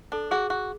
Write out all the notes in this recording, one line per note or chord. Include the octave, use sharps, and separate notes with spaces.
D4 A4
F#4 G#4
F#4